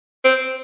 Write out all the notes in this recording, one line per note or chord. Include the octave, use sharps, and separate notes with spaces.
C4